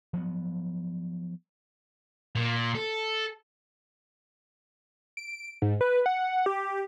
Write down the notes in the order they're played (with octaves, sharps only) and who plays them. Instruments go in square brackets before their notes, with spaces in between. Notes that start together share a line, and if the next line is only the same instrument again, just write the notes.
[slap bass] F3 F#3 B3
[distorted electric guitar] A#2
A4
[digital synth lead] D7
G#2
B4
F#5
G4